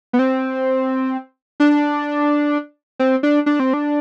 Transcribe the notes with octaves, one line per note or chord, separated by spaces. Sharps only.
B3
C4
D4
C4
D4
D4
C4
D4